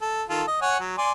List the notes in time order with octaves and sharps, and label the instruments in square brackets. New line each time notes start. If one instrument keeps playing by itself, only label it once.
[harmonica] A4
D#3 F4 A4
D#5
C#5 F#5 G#5
F#3
D5 G#5 C6